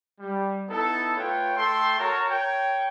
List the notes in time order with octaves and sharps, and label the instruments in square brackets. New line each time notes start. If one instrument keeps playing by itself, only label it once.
[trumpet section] G3
B3 D#4 E4 A4
A3 F4 B4 C#5 G5
A3 A4 G5 C6
F#4 A#4 C#5 A5 A#5
A#4 C#5 G5